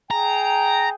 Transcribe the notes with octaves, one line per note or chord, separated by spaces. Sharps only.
G#4 G5 A#5